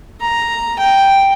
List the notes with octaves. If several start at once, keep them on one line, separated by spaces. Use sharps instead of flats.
A#5
G5